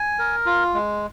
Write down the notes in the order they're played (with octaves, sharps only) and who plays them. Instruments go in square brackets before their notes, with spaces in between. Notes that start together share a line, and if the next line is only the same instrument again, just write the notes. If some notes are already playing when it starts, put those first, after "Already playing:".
Already playing: [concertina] G#5
A#4
F4
G#3